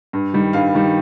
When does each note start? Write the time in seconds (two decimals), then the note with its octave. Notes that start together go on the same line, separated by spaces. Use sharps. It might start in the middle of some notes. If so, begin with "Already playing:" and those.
0.13 G2
0.33 D#3 G3
0.53 G2 F5
0.74 D#3 G3